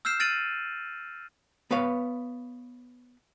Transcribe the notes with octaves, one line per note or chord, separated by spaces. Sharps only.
E6 F6 G6 C7 E7
F6 A6 A#6 D7 D#7 F#7
B3 B4 C#5 F5